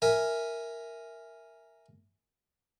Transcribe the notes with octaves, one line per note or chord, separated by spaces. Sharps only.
A#4 E5 G#5